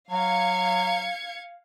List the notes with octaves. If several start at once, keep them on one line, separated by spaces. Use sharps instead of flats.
F#3 F5 G#6 C#7